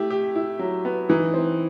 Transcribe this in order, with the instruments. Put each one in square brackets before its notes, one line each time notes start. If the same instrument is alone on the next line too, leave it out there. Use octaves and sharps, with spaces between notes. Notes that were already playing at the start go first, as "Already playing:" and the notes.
Already playing: [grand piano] A3 [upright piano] E4 G4
[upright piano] G4
E4
F#3
B3
[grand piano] E3 [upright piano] D#4
[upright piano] C4